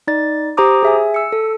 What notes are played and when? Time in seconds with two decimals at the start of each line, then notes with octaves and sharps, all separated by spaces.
0.07 D#4 D5 A6
0.57 G4 C5 A#5 D6 D#6
0.83 G#4 E5 G#5
1.14 E6 C#7
1.32 A4